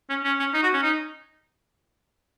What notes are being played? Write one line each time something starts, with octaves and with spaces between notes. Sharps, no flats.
C#4
C#4
C#4
D#4
F#4
C#4
D#4